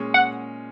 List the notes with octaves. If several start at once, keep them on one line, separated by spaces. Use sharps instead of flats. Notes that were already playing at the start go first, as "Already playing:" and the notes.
Already playing: A#2 G#3 C#4 G#4
F#5